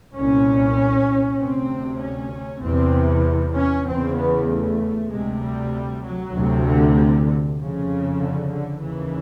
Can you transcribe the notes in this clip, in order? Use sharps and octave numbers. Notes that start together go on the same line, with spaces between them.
C2 A#2 C#4
D2 C3 C4
C#4
E2 C3 C4
C#4
E2 C#3 C4
B3
A3
D2 C3 G#3
G3
F#3
D2 C3
D3
D3
F2 C#3
D3
D3
D#2 C#3 E3